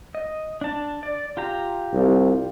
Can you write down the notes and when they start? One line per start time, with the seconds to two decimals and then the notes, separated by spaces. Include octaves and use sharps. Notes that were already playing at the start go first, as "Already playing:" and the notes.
0.15 D#5
0.61 D4 A5
1.03 D5
1.37 F4 G4 A#5
1.93 C2